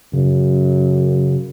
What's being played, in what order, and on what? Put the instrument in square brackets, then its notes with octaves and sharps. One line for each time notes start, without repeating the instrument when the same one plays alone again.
[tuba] F#2 [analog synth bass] C#3